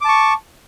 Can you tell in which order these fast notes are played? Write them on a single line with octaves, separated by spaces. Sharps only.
D6 A5 C#6